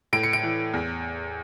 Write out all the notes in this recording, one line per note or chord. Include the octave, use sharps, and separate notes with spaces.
A2 D7
C#7
D7
E3
E2